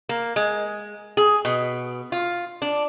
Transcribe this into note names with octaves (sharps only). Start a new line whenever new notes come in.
A#3
G#3
G#4
B2
F4
D4